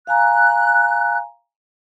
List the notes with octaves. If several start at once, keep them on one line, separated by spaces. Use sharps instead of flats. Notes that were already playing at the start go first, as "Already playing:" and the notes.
F5 G#5 A#5 F#6